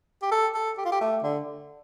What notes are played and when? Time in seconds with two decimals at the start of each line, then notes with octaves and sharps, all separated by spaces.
0.23 G4
0.31 A4
0.55 A4
0.78 G4
0.85 F4
0.92 G4
1.01 A3
1.23 D3